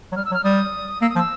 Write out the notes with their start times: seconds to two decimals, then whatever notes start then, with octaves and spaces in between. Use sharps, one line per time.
0.12 F#3
0.16 G3 F6
0.25 E6
0.31 F#3
0.34 F6
0.44 G3 D#6
1.01 A#3 E6
1.09 D#6
1.15 F3
1.18 E6